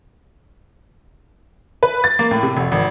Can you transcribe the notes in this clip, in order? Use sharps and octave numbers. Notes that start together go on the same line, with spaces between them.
B4
A6
A#3
A2
C3
F1
G#1